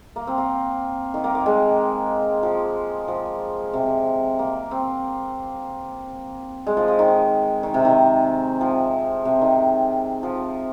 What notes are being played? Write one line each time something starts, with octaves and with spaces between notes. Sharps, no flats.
A#3
C4
A#3
D#3
A#3
A#3
G#3
F3
F3
C3
A#3
C4
G#3
F3
F3
D#3
D#3
C3
D#3
F3
C3
D#3
F3